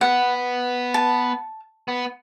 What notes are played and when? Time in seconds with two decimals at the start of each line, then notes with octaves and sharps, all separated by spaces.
0.01 B3 F#5
0.94 A5
1.88 B3